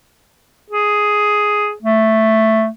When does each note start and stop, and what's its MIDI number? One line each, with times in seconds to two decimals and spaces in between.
0.70 1.72 68
1.82 2.67 57